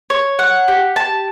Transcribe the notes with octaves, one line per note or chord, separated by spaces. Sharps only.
C#5
F#5
G4
A5